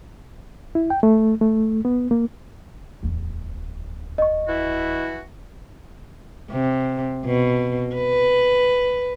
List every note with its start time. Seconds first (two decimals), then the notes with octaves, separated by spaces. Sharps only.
0.75 E4
0.90 G5
1.03 A3
1.41 A3
1.85 B3
2.11 A#3
3.03 D1 E2
4.18 D#5 C#6
4.47 E3 E4 F#4
6.51 C3
7.25 B2
7.95 B4